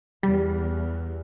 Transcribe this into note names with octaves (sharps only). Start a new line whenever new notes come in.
E2 G3